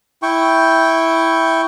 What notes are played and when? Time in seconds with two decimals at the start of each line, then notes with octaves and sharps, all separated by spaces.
0.23 E4 G5 C#6